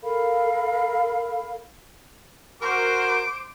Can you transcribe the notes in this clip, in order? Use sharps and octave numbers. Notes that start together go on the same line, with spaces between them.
A4 A#4 F5 B5
F#4 A#4 C5 D6